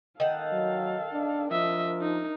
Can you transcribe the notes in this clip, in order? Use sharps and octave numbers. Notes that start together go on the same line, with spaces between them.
D#3 A4 F5 F#5
F#3
D4
F3 D4 A#4 D#5 E5
D#4